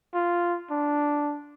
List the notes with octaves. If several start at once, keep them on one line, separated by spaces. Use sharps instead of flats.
F4
D4